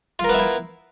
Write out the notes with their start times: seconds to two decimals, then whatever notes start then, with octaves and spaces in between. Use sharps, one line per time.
0.19 F4
0.24 A#4
0.29 B3
0.34 E5
0.39 E4